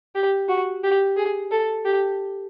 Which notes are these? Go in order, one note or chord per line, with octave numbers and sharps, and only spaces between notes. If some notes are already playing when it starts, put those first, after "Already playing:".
G4
F#4
G4
G#4
A4
G4